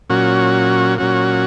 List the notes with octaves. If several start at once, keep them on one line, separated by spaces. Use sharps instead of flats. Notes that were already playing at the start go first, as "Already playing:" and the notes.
A#2 F#3 C#4 F#4
A#2 F#3 C#4 F#4